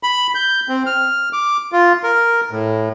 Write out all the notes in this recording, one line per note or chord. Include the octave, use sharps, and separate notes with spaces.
B5
G6
C4
F6
D6
F4
A#4
A2